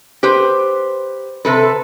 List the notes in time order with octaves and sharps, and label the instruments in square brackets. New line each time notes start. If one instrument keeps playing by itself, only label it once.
[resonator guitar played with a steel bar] G4 B4 C5
C3 A4 B4